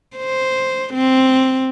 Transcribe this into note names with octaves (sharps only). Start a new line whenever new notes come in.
C5
C4